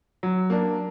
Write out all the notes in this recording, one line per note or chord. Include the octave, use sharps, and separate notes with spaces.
F#3
A#3 D4